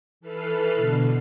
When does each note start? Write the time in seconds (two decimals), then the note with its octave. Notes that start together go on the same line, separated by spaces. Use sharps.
0.21 E3 A4 B4 F6 C7
0.75 B2 D3